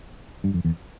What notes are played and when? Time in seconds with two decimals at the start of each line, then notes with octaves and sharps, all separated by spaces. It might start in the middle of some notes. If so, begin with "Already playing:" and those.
0.44 G2
0.54 F2
0.65 E2